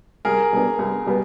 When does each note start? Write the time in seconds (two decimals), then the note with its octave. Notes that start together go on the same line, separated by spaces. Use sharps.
0.25 C2 G#4 A#4
0.53 B2 G3 B3 D4
0.79 C2
1.06 B2 G3 B3